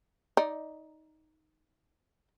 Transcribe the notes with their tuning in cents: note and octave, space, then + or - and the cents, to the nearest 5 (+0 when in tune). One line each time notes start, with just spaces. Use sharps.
D#4 +10 D5 +0